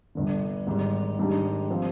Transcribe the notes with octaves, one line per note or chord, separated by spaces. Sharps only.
G1 G2 D3
G#1 G#2 G3
G#1 G#2 G3 D4 G4
F3 C4 F4